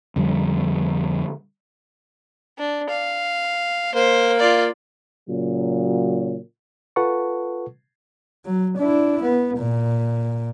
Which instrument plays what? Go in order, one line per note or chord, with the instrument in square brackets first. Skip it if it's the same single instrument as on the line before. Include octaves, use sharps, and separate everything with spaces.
[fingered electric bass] F2 D3 G3
[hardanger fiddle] D4
F5
[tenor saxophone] A#3 [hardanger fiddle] C5
[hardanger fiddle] F4 D5
[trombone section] A#2 C#3 F#3
[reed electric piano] F4 A4 B4 F#5 A5 C#6
[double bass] F#3
D4 E4
B3
A#2